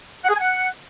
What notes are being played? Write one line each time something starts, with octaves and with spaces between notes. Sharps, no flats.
F#5
G#4
G#5
F#5